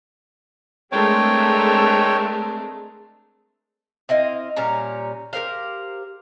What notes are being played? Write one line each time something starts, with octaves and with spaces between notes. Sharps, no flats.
G#3 A3 C4 D4 A#4 C#5 G5
C4 E4 D#5 F5
A#2 G3 C#4 A#5
G4 A#4 C5 F5